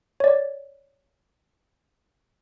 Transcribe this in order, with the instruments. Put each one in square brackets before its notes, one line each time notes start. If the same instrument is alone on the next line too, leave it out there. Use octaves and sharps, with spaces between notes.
[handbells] C#5 D5